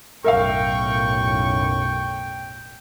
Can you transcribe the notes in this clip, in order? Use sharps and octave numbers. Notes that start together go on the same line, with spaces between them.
B1 F#2 A2 A#4 E5 F5 G5 C#6